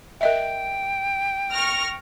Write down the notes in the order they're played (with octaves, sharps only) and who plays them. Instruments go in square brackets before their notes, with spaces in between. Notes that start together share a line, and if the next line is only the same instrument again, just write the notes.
[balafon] A#4 D#5 E5 [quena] G5
[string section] C#6 F6 A#6